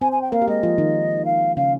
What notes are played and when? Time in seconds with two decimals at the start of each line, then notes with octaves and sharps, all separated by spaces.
0.01 C4 C5 G#5
0.12 G#5
0.21 G5
0.32 A#3 A#4 F5
0.42 G4
0.48 G#3 G#4 D#5
0.63 F3 F4
0.78 D#3 D#4
1.25 F5
1.56 C#3 C#4 F5